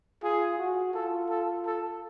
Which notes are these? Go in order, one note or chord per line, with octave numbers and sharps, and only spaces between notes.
F4 G#4
F#4
F4 A4
A4
A4